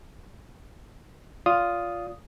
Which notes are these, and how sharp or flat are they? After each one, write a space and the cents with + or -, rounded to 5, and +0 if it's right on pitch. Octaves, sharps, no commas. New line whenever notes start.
F4 +0 D5 -30 D#6 +0